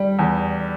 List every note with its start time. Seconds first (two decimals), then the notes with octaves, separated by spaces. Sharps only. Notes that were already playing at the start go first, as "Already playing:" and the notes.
Already playing: G3
0.19 E2